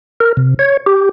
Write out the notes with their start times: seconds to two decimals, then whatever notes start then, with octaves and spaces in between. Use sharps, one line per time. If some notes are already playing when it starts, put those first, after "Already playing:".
0.20 A#4
0.37 C3
0.59 C#5
0.86 G4